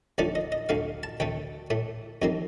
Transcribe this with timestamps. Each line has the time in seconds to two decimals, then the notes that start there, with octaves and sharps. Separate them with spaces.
0.18 D#2 D3 F3 A3 D5
0.35 D#5
0.52 D#5
0.69 D2 D3 A3 F5
1.03 A5
1.20 D2 D3 A3 G5
1.70 A2 A3
2.22 F2 D#3 G3 A#3